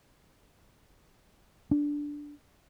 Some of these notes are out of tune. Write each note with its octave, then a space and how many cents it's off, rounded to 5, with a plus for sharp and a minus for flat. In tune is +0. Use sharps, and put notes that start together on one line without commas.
D4 -5